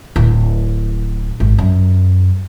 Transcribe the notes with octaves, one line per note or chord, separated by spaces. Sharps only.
D1
G#1
F#2